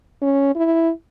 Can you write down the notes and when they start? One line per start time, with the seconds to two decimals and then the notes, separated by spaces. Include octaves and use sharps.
0.22 C#4
0.55 E4